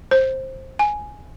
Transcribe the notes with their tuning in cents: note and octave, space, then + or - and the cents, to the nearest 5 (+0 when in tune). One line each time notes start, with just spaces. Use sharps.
C5 +15
G#5 +5